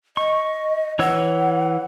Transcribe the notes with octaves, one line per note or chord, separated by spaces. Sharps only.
D#5 C#6
E3 C#5 F#5 E6